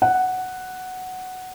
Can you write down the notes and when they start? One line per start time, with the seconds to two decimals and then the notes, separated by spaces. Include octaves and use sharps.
0.02 F#5